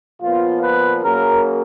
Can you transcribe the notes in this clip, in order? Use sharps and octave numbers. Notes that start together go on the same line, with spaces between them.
A#2 F3 B3 F4
B4
C#3 F#3 A#3 A#4